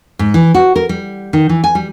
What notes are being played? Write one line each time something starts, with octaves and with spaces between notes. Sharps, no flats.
G#2
E3
F#4
A#4
G3
D#3
E3
G#5
G3